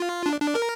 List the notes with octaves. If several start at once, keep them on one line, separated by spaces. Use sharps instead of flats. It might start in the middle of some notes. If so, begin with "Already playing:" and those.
Already playing: F4
D4
D4
A#4